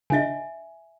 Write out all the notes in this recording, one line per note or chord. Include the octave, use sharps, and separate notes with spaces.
C#3 D4 D#5 E5 G#5